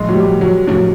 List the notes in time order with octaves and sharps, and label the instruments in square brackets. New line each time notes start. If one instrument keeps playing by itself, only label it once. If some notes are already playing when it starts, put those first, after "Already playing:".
Already playing: [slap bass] A2 F3 A3 D4 [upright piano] G#3
[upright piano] F#3
G3
F#3
[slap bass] A2 F3 A3 D4 [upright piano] F#3